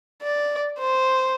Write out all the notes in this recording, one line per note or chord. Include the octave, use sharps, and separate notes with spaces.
D5
C5